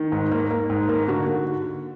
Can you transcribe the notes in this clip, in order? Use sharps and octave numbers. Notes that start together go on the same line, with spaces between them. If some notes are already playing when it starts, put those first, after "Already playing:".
Already playing: D#3
G#2
A#3
A#3
G#2
A#3
D3 F#4